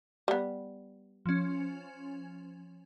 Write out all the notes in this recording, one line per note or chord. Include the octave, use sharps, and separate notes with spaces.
G3 B3
F3 C#4